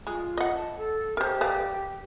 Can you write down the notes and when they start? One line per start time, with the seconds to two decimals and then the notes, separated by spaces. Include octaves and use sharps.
0.07 G#3 F4
0.37 D#5 F#5
0.55 A5
0.78 A4
1.17 G4 A#4 C5
1.41 B4 D5 F5